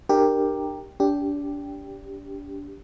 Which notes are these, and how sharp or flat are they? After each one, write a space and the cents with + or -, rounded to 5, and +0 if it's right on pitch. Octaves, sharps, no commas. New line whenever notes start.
D4 +40 G4 +5 A#4 +0
D4 -30 G4 +0